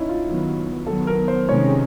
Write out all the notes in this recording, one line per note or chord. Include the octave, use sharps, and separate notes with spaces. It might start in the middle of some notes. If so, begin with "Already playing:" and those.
Already playing: C#4 D#4 E4
F4
D#3 F#3 B3
D#3 F#3 B3 A4
A#4
C5
C3 D#3 G#3 C#4 C#5